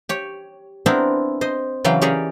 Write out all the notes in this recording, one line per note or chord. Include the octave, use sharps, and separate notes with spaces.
G4 C#5
B3 C4 D4 E4 A#4 C5
C5 D#5
C#3 E3 F#3 F5 G5
C#4 G4 G#4 A#4 C#5 D5